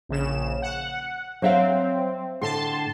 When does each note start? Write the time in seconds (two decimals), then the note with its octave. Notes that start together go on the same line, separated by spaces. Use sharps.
0.09 A#1 C#3 E7
0.62 F#5
1.42 F#3 C4 E5 F5
2.42 A2 D3 A5 C6